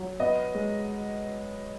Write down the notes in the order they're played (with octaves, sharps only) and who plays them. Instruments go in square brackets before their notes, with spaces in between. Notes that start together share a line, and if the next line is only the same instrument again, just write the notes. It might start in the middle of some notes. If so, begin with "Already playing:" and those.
Already playing: [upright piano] F#3
B3 D#5
G#3